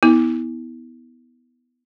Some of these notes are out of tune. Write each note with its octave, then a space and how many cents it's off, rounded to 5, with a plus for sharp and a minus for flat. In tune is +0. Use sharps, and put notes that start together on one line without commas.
B3 +0 E4 -35